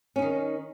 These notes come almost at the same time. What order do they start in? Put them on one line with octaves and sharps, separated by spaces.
C#4 D#4 D#3